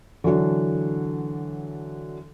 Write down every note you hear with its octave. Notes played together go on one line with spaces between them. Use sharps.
D3 E3 F#3 D4